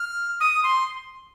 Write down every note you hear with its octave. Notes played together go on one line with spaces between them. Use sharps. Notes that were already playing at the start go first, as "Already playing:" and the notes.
Already playing: F6
D#6
C6